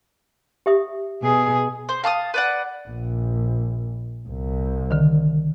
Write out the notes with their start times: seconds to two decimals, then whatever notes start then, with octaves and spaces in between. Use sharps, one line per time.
0.66 G4 E5 D#6
1.22 B2 G#4
1.89 C5
2.04 F5 A5 D6 D#6
2.34 B4 D5 F#5
2.88 A#1
4.28 C2
4.91 D3 D#3